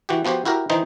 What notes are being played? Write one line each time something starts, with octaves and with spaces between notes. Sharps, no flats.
E3 F#4 G4
F3 B3 F#4 G4 C5
E4 F#4 G4 A#4
D#3 E3 D#4 C5